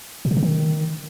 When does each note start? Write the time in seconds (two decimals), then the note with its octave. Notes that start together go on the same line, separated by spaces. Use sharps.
0.25 A#2
0.31 C3
0.37 C#3
0.43 D#3